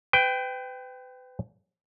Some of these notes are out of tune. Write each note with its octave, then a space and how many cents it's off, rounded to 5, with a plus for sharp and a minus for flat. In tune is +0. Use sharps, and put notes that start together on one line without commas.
B4 +35 G5 +0